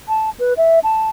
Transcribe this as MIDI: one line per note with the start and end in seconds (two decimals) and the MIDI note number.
0.08 0.30 81
0.39 0.53 71
0.57 0.79 76
0.83 1.10 81